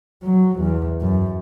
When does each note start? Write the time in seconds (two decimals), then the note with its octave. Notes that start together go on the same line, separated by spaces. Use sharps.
0.23 F#3
0.60 E2
1.01 F#2